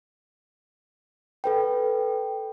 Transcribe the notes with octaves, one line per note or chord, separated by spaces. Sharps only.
A4 B4 G5